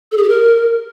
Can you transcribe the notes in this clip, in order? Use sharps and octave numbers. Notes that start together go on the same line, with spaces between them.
A4
G#4
G4
A#4